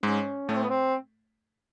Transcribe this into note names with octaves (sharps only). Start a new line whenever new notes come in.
G#2 G#3 C#4
A2 A3 C#4
C4
B3
C4